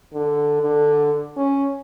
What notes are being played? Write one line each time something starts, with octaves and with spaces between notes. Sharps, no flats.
D3
D3
C#4